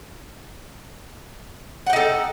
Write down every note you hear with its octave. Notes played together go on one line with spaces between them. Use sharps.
D#4 A4 F#5 G5